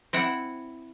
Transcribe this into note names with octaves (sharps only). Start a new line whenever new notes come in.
C4 E4 F#5